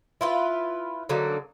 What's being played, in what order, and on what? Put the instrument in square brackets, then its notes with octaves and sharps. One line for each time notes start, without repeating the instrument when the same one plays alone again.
[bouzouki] E4 F4 B4
D3 F#3 A#3 D#4